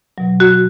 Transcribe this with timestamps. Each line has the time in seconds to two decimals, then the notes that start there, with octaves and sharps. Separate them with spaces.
0.18 B2 F#3
0.40 F#4